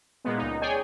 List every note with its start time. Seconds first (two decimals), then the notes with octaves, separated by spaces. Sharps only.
0.24 A#2 G#3 B3
0.38 C#2 D#4
0.62 G#4 C#5 D5 G5 G#5